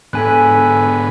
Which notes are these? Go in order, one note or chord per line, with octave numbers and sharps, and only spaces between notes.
G#2 D3 B3 A4 G#5 F#6